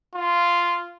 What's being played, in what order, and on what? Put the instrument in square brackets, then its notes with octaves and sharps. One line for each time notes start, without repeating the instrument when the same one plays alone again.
[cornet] F4